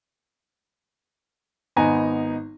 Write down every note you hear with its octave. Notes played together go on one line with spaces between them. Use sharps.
G#1 B3 D#4 G#5 A#5